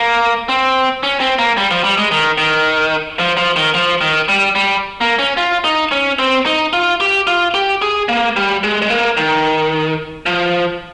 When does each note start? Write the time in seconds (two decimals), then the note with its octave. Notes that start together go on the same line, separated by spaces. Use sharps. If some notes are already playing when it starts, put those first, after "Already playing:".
Already playing: A#3
0.49 C4
1.03 C#4
1.20 C4
1.39 A#3
1.57 G3
1.71 F3
1.84 G3
1.98 G#3
2.11 D#3
2.38 D#3
3.19 F3
3.37 F3
3.56 D#3
3.74 F3
4.01 D#3
4.29 G3
4.55 G3
5.01 A#3
5.19 C#4
5.37 F4
5.64 D#4
5.92 C#4
6.19 C4
6.46 D#4
6.73 F4
7.01 G4
7.27 F4
7.54 G4
7.82 G#4
8.09 A#3
8.36 G3
8.64 G#3
8.82 G#3
8.90 A#3
9.17 D#3
10.26 F3